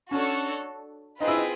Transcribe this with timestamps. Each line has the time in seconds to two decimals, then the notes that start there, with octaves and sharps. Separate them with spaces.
0.11 C#4 D4 F#4 A4 C#5
1.20 C4 D#4 F4 G#4 B4
1.28 E4
1.36 D#4